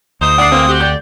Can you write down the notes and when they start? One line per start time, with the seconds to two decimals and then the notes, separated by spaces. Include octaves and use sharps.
0.21 D2 D#4 C5 D#6
0.38 D4 F#5 D6 C7
0.52 E3 G#3 A#3 C4
0.69 F#4 G4
0.80 D5 G6